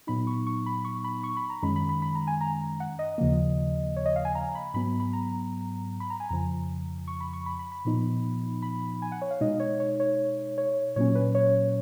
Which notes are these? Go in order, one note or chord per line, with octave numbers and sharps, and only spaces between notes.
A#2 F#3 B3 D#4 B5
C#6
C#6
B5
C#6
B5
C#6
B5
A#5
F#2 D#3 G#3 C#4 B5
B5
B5
B5
A#5
G#5
A#5
F#5
D#5
D#2 C#3 F3 A#3
C#5
D#5
F5
G#5
A#5
B5
G#2 F#3 B3 B5
B5
A#5
B5
A#5
G#5
F2 C#3 F3 A#5
C#6
B5
C#6
B5
B5
B5
A#2 F3 B3 D#4
B5
G#5
F#5
C#5
F5
B2 G#3 D#4 D#5
C#5
C#5
C#5
C#5
A#2 F#3 A#3 C#4 C#5
B4
C#5